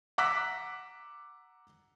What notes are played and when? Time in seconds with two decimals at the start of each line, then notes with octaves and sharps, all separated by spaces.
0.18 F#5 A#5 D6 E6 F#6 B6